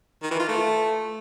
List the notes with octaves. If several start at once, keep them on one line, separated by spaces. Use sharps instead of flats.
D#3
E3
F4
A3